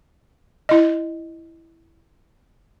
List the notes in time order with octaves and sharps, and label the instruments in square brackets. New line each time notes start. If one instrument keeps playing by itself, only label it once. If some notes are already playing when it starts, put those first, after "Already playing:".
[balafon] E4 D#5